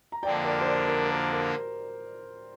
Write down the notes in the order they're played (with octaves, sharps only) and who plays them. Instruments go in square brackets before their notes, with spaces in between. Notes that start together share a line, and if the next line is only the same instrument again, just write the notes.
[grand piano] A#5
[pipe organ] F2 D3 A#3 D4 [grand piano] D5 G5
[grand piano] A#4 D5
C5
A#4 D5
A#4
A#4
A#4